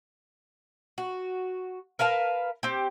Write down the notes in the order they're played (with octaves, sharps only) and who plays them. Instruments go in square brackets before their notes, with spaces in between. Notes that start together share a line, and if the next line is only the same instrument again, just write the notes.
[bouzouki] F#4
A#4 B4 F5 A5
C4 G4